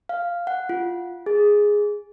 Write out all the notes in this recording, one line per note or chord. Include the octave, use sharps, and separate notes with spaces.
F5
F#5
F4
G#4